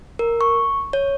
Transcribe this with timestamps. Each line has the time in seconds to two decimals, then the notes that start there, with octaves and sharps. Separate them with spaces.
0.19 A#4
0.41 C#6
0.93 C#5